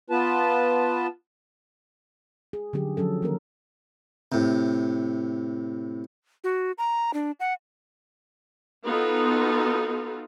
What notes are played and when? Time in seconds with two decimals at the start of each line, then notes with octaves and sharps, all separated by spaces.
0.10 B3 F4 B4 A5
2.53 G#4
2.73 D3 F3 F#3 C#4 G4 G#4
2.97 F3 F#3 C#4 A4
3.22 D#3 F3 A#3 C#4 A#4
4.32 A2 C3
6.44 F#4
6.78 A#5
7.14 D4
7.40 F#5
8.85 B3 D#4 F4 F#4 A4